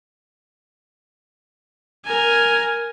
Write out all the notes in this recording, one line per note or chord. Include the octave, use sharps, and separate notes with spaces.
A#4 G#5